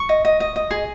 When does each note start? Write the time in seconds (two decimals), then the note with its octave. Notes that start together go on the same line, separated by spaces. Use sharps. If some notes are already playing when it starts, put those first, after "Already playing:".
Already playing: C#6
0.09 D#5
0.25 D#5
0.40 D#5
0.56 D#5
0.71 G#4